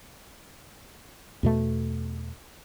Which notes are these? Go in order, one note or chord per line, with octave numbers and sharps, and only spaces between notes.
E2 B2 A3